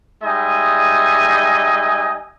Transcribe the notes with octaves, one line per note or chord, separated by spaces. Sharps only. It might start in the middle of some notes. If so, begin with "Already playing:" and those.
G3 G#3 D#4 D#5 E5 G#5